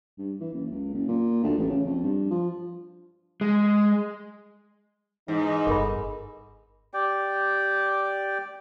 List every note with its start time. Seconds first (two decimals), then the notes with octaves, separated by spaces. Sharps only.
0.18 G2
0.40 E3
0.53 F#1
0.71 C#2
0.93 F#1
1.08 A#2
1.43 D2
1.58 A1
1.70 C#3
1.86 F2
2.03 G2
2.31 F3
3.41 G#3
5.28 G#2 E3 D#4
5.67 G1 A4 A#4 B5
6.94 G4 D5 G5